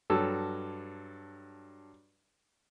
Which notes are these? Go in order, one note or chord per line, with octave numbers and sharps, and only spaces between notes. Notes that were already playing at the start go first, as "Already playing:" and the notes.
G2 F#3 A4 E6